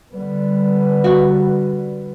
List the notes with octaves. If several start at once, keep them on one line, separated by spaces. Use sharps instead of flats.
D3 G3 B3
F#4